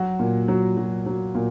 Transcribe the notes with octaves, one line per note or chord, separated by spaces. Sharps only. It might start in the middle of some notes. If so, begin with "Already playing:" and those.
Already playing: F#3 F#4
A#2
F#3
F#3
F#3
A#2